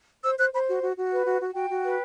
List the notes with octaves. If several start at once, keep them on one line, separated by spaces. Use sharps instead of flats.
C5 E6
C5 F#6
C5 B5
F#4
F#4
F#4
B4
F#4
F#4
F#4 G5
F#4
B4